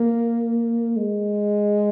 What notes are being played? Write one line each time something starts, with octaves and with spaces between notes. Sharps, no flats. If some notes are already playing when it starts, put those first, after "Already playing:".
Already playing: A#3
G#3